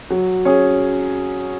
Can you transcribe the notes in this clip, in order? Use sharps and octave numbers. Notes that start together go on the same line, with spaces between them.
F#3
C#4 G#4 C#5